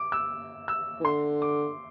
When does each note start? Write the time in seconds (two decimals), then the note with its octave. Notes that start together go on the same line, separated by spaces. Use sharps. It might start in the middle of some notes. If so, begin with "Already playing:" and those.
Already playing: D6
0.12 E6
0.68 E6
1.00 E3
1.04 D3 C6
1.42 D6